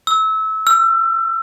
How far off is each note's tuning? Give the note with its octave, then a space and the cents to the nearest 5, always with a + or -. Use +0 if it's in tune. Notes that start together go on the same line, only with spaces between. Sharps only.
E6 -25
E6 +35